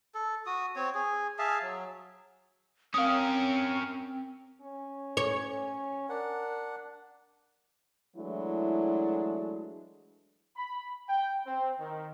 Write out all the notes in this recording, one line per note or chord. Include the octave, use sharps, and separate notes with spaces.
A4
F#4 D#6
C4 C#5
G#4
G#4 E5 F5 A5
F#3
C4 C#4 A#4 F5 D#6
C#4
C#5
D4 A#4 F#5
E3 F#3 G#3 A3 D4 E4
B5
G5
C4
D#3